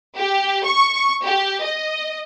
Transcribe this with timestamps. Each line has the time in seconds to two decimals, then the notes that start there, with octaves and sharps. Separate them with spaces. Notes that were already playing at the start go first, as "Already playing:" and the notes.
0.16 G4
0.64 C#6
1.24 G4
1.63 D#5